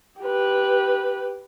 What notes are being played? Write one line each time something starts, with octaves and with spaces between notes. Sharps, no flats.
G4 B4